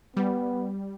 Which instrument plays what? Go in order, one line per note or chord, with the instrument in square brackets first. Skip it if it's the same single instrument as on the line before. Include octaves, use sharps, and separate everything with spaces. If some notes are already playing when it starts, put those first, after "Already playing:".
[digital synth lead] G3 [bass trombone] B3